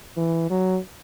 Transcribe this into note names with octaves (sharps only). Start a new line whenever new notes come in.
E3
F#3